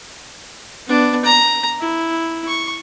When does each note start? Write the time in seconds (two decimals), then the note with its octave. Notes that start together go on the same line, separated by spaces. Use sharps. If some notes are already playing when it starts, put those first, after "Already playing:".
0.87 B3 D4
1.25 A#5
1.80 E4
2.48 C#6